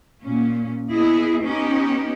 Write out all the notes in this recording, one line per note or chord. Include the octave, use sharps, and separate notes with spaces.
A#2 C#4
B3 E4 G#4 D#5
B3 C#4 D#4 G4